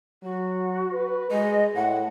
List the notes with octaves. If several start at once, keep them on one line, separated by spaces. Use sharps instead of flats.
F#3 F#4
B4
G#3 D#5
A2 F#5